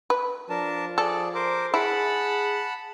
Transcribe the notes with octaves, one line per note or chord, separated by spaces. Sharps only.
B4
F3 D4 A#4 A5
G#4 A4 D5
A#4 C5 D6
E4 G#4 F#5 A5 B5